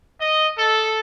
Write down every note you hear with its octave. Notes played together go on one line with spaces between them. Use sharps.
D#5
A4